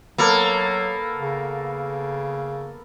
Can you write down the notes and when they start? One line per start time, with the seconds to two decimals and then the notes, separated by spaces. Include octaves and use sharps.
0.18 F#3 A#3 B3 A4 A#4
1.17 C#3